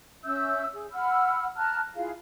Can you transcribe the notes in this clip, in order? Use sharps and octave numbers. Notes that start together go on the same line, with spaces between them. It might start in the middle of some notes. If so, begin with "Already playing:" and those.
C#4 E5 E6 G6
G#4
F#5 B5 E6 F6
A5 A#5 F6 F#6
E4 F4 G#4 F5